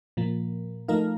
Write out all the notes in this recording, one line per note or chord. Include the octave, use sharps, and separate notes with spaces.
A#2 F3 A#3
F3 A3 D#4 A#4 F5